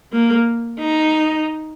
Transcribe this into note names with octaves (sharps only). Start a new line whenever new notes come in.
A#3
D#4